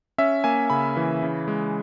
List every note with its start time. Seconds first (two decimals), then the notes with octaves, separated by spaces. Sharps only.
0.18 C#4 E5
0.44 A#3 G#5
0.70 C#3 B5
0.97 E3
1.23 C#3
1.48 G#3